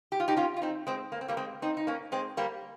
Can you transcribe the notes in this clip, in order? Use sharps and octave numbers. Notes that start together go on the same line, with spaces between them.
G4
F4
D#4 G4
C#4 F4
F4
C4 D#4
G#3 C4
A#3
C4
G3 A#3
G#3 C4
C4 D#4
D#4
A#3 C#4
G#3 C4
G3 A#3